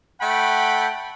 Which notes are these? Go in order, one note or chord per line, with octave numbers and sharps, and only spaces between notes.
A3 F#5 G5 B5